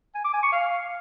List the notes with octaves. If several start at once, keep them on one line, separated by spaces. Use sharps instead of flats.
G#5
D6
G#5
C#6
F5